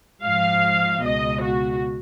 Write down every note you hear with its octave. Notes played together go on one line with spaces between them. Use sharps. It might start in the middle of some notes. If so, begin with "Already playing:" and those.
G#2 F3 F5
C#2 B2 D#5
F#4